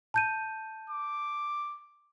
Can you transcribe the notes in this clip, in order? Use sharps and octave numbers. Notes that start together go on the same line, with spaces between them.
A5 G6 D#7
D6